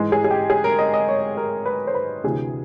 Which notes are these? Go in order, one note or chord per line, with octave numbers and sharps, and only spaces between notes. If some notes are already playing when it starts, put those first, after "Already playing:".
Already playing: G#2 E3 G#3
G#4
G#4
G4
G#4
A#4
D#5
D#5
C#5
A#4
B4
C5
B4
D2 C3 E3 G#4